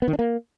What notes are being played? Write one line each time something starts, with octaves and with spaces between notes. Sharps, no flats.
B3
D#3
D4
A#3